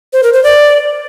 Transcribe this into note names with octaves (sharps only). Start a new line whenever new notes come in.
C5
A#4
C5
D5